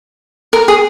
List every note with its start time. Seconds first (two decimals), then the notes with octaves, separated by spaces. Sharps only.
0.53 A#4
0.68 G#4